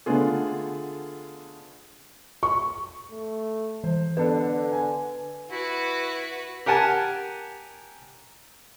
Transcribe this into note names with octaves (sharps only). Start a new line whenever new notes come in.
D3 A3 B3 D4 F4 G#4
C#6
A3
E3 C5
D3 B3 D4 A4 B4
G#5
E4 F#4 B4
G4 A#4 F#5 G#5 A5